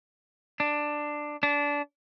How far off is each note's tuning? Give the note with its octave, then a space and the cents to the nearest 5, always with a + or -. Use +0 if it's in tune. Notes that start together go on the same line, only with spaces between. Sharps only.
D4 +10
D4 -20